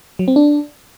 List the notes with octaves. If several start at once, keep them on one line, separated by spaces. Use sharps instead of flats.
F#3
C4
D4